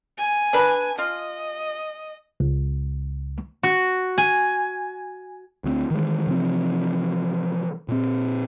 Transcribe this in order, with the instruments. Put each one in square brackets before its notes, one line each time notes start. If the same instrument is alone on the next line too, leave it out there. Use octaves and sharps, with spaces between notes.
[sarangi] G#5
[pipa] D4 B4
[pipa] F4 [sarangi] D#5
[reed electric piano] C#2
[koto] F#4
G#5
[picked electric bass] D2 G#3 C4
D#3 E3 G#3
C3 E3 F3 C4
A#2 C4